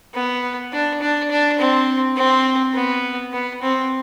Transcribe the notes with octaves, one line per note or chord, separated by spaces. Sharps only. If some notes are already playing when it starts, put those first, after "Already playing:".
B3
D4
D4
D4
C4
C4
B3
B3
C4